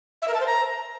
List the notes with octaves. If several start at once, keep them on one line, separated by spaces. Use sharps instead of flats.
E5
A#4
A5
C5
A#5